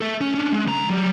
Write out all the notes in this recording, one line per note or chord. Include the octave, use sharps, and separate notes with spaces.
A4 E5
C#4
C#4 D4
G#3
C#2 A#5
F#3 G3